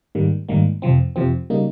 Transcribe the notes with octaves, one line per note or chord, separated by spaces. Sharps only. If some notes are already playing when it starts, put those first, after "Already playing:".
G#2 D#3 G3 A#3
G#2 D#3 G3 A#3
F2 C3 F3 C4
F2 C3 F3 C4
C#3 G3 A#3 D#4